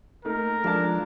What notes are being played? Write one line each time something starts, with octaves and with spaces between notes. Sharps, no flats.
A3 A#3 D#4 A#4
F3 G#3 D4 A5